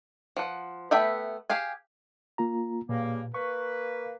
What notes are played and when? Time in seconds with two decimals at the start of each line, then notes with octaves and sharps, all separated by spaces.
0.37 F3 F#5
0.91 A3 B3 E5 G5 B5
1.50 G4 G#4 F5 G#5
2.38 A#3 F4 A#5
2.89 G2 A#2 C#3 A#3
3.34 A#3 B4 C#6